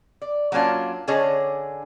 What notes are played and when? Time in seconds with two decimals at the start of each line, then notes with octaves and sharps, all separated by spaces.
0.22 D5
0.52 F#3 A#3 C#4 D4 F4
1.08 D3 C#4 D4 G#4 C#5 D#5